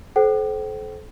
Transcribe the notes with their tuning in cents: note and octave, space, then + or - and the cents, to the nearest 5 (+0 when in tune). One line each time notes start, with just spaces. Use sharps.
A4 -35 C5 +0 G5 -40